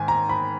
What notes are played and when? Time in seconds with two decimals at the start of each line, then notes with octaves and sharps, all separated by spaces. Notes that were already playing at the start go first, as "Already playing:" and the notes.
Already playing: G#2 D#3 G#5
0.08 A#5
0.29 B5